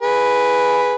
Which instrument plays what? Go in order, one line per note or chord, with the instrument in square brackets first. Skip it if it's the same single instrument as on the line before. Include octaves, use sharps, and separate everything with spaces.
[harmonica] G#4 B4